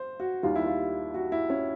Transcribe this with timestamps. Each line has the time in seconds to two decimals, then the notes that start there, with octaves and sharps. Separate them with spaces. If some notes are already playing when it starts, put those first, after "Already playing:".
Already playing: C5
0.20 F#4
0.43 D#2 D#3 G3 F4
0.55 E4
0.66 F4
1.14 F#4
1.32 E4
1.50 C#4